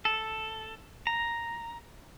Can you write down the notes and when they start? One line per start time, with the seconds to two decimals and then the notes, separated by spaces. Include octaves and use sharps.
0.05 A4
1.07 A#5